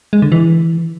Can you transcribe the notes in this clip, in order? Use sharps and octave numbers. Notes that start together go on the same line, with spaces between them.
G#3
D3
E3